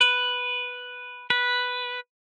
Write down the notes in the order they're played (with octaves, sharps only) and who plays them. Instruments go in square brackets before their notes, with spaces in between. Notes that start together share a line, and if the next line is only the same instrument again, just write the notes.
[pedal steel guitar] B4
B4